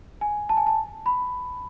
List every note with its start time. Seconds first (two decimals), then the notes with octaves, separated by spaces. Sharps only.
0.21 G#5
0.49 A5
0.57 G#5
0.67 A5
1.06 B5